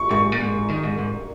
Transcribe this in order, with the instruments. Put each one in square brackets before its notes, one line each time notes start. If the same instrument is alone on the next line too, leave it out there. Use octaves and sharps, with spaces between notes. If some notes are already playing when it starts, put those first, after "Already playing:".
Already playing: [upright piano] C#6
[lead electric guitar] G#2 [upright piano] C#6
[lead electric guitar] A#2
G#2
D#3
G#2
G#2